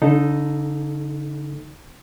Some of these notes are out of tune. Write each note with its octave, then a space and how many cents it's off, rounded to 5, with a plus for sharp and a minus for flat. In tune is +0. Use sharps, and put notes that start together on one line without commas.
D3 -40 D#4 +0 A4 +0